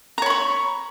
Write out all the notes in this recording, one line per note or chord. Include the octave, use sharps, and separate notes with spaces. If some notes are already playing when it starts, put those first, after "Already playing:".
C#5 A#5 B5 C#6